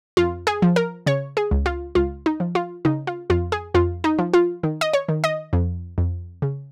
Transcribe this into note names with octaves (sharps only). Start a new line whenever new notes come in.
F2 F4
G#4
F3
A#4
C#3 C#5
G#4
C#2
F4
C#2 F4
D#4
F3
F4
C#3 D#4
F4
F2 F4
G#4
F2 F4
D#4
F3
F4
D#3
D#5
C#5
D#3
D#5
F2
F2
C#3